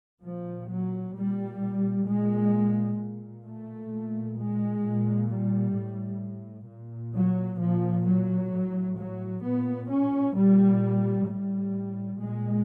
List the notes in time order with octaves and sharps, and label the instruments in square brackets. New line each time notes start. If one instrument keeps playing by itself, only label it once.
[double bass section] A#2 F3
F#3
A#2 G3
A#2 G#3
A#2
A3
A#2
G#3
A#2
G3
A2
A#2
F#3
A#2 F3
F#3
A2
F#3
A#2 B3
C#4
A#2 G3
A2 G3
A#2 G#3